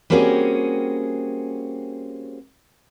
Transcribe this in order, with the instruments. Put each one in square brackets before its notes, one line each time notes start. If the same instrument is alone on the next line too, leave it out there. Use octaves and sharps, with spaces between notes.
[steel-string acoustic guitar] G3 A#3 C4 C#4 F#4 G#4